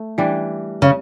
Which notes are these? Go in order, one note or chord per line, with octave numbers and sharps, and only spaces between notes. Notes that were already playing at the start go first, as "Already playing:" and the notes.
Already playing: A3
E3 G3 D4
C#3